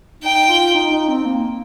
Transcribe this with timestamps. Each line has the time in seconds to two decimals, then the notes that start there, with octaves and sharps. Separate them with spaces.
0.23 D#4 G5
0.48 F4
0.75 D#4
0.91 D#4
1.09 C4
1.26 A#3